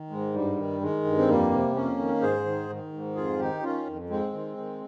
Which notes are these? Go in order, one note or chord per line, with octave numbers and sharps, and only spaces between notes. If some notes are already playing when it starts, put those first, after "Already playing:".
Already playing: D#3
G#2 G#3
G2 G3
D#3
D#3 G#3
G2
C4
F2 G3 A#3
C3
F2 A#3 C#4
D#3
G#2 G#4 C5
D#3
D#3
G#2
F2 F4 G#4
D#3 D#4 G4
D#3 C#4 F4
F2
G#2 G#3 C4
D#3
D#3